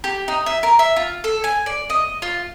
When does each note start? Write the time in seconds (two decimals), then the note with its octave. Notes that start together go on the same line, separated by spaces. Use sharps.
0.04 G4
0.28 D#4
0.46 E5
0.63 A#4
0.79 E5
0.96 F4
1.24 A4
1.44 G#5
1.66 D5
1.90 D#5
2.22 F4